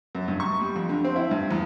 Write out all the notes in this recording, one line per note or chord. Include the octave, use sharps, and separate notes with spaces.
F#2
G2
C#6
G3
F2
D3
C4
E4
G2
E2